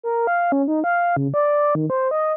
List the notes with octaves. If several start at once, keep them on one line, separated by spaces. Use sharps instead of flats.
A#4
F5
C#4
D#4
F5
C#3
D5
D#3
C5
D#5